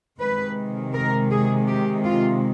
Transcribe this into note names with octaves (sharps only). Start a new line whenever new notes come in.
C3 D#3 G#3 B4
A#4
G#4
G4
F4